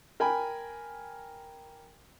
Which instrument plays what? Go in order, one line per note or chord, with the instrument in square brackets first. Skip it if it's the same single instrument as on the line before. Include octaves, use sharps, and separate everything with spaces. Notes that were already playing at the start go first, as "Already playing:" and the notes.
[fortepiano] A#4 G5 G#5 B5